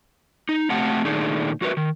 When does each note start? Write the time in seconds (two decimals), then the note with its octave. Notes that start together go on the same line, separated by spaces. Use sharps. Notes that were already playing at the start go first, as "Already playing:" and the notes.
0.49 D#4
0.70 C3 A3 C4 G4 F#5 A5
1.05 A#2 D#3 A3 D4 D#4 G#4
1.61 F2 F#4 A#4 B4 E5
1.77 D#3